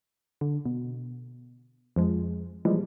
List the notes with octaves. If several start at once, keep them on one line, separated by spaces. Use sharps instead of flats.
D3
B2
F2 F3 G#3
A#2 E3 F3 G3 G#3